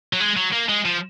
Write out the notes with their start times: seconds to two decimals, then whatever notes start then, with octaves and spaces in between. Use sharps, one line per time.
0.13 F#3
0.20 G#3
0.37 F#3
0.53 A#3
0.69 G#3
0.85 F3